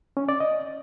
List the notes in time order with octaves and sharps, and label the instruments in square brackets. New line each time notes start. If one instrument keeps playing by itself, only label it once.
[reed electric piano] C#4
D5
D#5